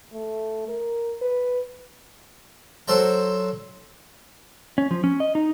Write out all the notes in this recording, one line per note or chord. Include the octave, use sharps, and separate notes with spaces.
A3
A#4
B4
F#3 A4 C5 D5 A#5
C#4
F3
C#4
D#5
D#4